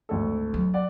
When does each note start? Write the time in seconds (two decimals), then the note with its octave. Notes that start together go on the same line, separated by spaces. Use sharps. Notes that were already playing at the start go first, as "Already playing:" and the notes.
0.09 G#1 D2 A4
0.54 F#3
0.74 D5 F#5